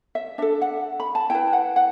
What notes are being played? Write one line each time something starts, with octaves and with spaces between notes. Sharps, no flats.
E5
D4 A4 E5
F#5
B5
A5
E4 B4 G5
F#5
F#5